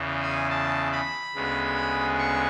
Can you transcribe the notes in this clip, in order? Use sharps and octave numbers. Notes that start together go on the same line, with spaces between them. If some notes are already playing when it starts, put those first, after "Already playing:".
Already playing: E2 C#3 E3
G#5
A5
B5
D2 C#3 G#3 B3
C#6